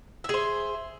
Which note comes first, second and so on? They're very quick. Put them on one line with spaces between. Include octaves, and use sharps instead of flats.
E5 G#4 C5